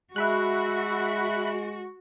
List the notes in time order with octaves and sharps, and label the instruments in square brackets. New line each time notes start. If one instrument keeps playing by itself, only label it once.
[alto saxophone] G#3 [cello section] F#4 [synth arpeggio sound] E5 B5 F#6